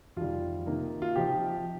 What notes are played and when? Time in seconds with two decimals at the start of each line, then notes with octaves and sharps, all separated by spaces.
0.17 F2 C3 D#3 G3 F4
0.66 C3 D#3 A#3 D#4
1.02 F4
1.16 C3 F3 D#4 G4